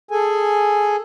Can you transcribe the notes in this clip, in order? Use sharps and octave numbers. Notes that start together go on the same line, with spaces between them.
G#4 A4 G#5